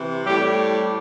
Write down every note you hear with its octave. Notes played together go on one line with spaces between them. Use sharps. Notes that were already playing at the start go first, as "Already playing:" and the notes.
Already playing: C3 E3
A2 G3 G4